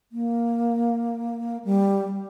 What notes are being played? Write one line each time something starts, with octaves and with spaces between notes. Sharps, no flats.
A#3
G3